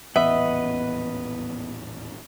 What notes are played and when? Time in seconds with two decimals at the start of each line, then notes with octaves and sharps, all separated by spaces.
0.16 D#1 A1 E2 B3 B4 D#5 E5 F#5